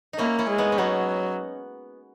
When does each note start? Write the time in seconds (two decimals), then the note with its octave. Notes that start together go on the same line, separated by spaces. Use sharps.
0.13 D#4
0.18 A#3 C#4 E4
0.38 C#4 E4
0.49 G#3
0.58 B3 D#4
0.72 C#4
0.78 F#3 B3 D#4